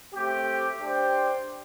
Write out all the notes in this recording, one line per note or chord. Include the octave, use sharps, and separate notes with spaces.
A3 C4 G4
D4 G4 C5 G5